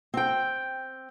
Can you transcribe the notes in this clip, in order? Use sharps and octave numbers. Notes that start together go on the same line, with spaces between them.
C4 G5